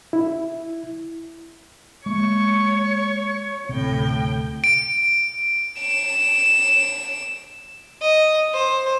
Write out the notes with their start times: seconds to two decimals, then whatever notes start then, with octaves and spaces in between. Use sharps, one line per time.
0.13 E4
2.06 G#3 A#3 C#5 C#6
3.69 D2 A2 C3 C4 G5
4.64 D7
5.81 E7
8.02 D#5
8.54 C5